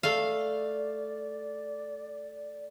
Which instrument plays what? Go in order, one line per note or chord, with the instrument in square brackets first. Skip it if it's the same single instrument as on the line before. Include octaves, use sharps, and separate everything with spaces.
[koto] A3 F5 [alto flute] D5